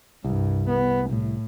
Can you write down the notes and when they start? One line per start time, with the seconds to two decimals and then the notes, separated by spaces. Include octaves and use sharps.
0.24 C2 G2
0.69 B3
1.09 A2